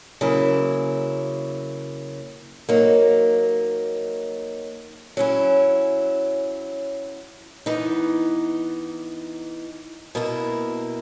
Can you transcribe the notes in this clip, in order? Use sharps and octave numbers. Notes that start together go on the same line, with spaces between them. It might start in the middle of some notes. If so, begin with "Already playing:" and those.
C#3 F#3 A#3 E4
F#3 A#3 D#4
F#3 C#4 E4
E3 B3 D#4
B2 A#3 E4